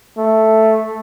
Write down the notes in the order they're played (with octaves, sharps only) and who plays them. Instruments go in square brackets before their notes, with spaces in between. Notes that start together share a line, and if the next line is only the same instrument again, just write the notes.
[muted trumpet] A3